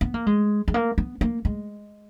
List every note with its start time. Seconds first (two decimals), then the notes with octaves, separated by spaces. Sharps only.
0.01 B3
0.14 A#3
0.27 G#3
0.68 G#3
0.74 A#3
0.98 B3
1.21 A#3
1.45 G#3